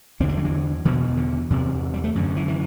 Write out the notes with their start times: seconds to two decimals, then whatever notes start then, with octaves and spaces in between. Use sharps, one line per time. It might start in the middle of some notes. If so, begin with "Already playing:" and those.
0.20 E2 D3 C4
0.28 D4
0.37 F#3
0.45 E3
0.85 E2 B2 D3
1.17 D3
1.50 E2 C3
1.94 G3
2.04 A3
2.15 F#2 D3
2.36 E3
2.48 E3